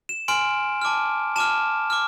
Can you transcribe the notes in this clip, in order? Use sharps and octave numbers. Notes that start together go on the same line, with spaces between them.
E7
G#5 C6 F6 D7
A5 D6 F6
A5 D6 F6 E7
D6 F6